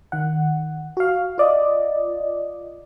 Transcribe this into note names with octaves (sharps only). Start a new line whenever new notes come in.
D#3 F#5
F#4 F5
F4 D5 D#5